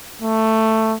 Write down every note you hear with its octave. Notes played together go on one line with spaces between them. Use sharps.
A3